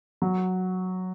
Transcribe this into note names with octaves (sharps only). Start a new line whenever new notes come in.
F#3